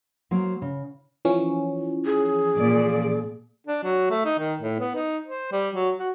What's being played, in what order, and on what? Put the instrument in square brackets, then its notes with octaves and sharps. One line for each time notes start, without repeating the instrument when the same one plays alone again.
[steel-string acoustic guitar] F#3 A#3 C5
C#3
[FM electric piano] E3 F3 C#4
[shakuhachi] G#4
[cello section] A#2 D5
[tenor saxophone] D4
F#3
A3
D#4
D#3
A2
B3
D#4
C5
G3
F#3
F#4